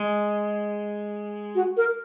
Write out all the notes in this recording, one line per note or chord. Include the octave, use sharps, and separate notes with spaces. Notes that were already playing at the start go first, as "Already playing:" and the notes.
Already playing: G#3
F#4
A#4